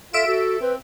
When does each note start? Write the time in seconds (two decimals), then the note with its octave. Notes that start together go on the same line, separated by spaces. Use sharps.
0.13 F4 A4 E5 D7 E7
0.27 F#4 A4
0.61 C4 B4